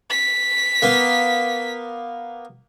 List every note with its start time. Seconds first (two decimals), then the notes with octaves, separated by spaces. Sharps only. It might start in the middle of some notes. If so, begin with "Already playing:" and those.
0.10 B6
0.82 A#3 B3